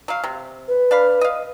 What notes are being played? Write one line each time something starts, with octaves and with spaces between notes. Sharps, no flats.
F#3 F5
C3
B4
D4 F5 B5
D#5 F5